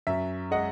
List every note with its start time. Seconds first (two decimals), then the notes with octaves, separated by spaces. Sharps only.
0.07 F#2 E5
0.51 G#3 D#5 F#5